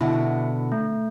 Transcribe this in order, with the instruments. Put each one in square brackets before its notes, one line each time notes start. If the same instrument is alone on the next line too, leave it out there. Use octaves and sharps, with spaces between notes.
[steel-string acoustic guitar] B2 D3 [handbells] E4 E5 F#5
[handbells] A3